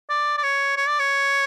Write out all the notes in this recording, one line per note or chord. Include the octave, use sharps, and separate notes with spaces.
D5
D5
C#5
C#5
D5
C#5